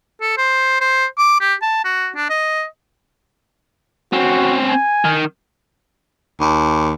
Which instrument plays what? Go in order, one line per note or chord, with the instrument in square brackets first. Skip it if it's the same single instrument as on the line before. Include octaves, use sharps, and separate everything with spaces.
[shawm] A4
C5
C5
D6
G4
A5
F#4
D4
D#5
[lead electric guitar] C4 C#4 [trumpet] F#4
[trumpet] G#5
[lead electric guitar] D#3
[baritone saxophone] D#2